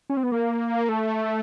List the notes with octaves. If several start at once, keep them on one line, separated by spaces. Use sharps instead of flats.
C#4
C4
B3
A#3
A3